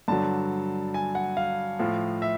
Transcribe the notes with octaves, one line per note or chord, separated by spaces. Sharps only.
G2 D3 F#3 A5
G#5
F#5
F5
A2 F3
E5